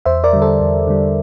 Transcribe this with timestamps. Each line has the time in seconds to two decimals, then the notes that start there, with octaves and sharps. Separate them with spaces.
0.05 E2 C5 E5
0.24 A#4 D5
0.33 D3 G3
0.42 A4 C5
0.60 E2
0.87 D3 G3